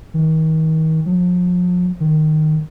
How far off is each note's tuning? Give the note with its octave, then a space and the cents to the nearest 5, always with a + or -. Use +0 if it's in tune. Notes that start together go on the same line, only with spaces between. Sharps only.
D#3 +35
F3 +40
D#3 -10